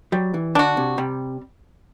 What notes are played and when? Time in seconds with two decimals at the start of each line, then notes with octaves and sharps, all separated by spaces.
0.12 F#3 G3
0.34 E3
0.55 D3 D4 F#4
0.77 C3
0.98 C3 G3